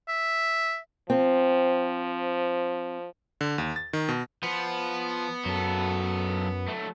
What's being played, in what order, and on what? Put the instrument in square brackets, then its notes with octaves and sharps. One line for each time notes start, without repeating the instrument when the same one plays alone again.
[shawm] E5
[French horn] F3 [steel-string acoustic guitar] C4
[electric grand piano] D3
D#2
A6
D#3
B2
[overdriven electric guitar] F3 [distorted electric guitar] B3
[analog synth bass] F#2 [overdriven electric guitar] F#3 A4
[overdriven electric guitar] F#3 A3